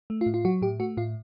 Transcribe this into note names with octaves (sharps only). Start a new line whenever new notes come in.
A3
F4
A2
F4
F#3 F#4
A2 G4
A3 F#4
A2 F4